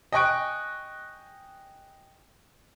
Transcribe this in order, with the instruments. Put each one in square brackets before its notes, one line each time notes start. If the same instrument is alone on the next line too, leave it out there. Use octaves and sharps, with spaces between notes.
[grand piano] D#5 G5 G#5 C#6 F#6 D7